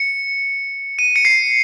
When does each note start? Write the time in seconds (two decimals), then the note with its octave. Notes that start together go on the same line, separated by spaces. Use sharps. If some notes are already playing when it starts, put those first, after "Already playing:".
Already playing: C#7
0.99 D#7
1.16 C#7
1.25 C7